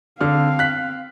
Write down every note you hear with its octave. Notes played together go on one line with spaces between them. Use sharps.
D3 C4 F5 F6
F#6 B6